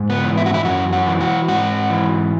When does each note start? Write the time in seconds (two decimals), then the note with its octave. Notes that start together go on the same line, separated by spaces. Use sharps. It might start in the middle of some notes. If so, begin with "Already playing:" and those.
Already playing: G#2
0.10 B3
0.24 E3
0.38 E4
0.46 F#4
0.54 E4
0.65 F#2 F#4
0.93 F#4
1.06 E3
1.21 F#4
1.48 G#2 F#4
1.90 E3